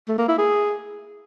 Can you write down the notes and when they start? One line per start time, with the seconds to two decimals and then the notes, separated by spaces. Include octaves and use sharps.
0.08 A3
0.18 A#3
0.28 E4
0.38 G#4